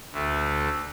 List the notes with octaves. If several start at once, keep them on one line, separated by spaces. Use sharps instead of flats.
D2 D3 A3